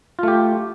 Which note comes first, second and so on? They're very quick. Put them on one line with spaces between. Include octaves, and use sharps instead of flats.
F4 A3 G4